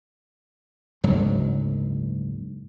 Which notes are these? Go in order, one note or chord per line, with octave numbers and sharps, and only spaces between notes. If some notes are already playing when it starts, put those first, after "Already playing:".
F#1 D2 G#2 F#3